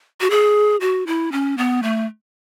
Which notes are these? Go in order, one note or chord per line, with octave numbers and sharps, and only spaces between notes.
F#4
G#4
F#4
E4
C#4
B3
A3